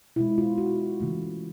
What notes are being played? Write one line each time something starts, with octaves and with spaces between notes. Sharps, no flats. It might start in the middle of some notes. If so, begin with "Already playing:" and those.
B2 G#3 E4
F4
F#4
C#3 E3 A3